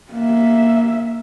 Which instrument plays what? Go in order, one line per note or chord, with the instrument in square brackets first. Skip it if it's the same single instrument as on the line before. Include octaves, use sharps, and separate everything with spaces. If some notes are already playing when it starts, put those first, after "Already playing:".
[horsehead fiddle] A#3 E5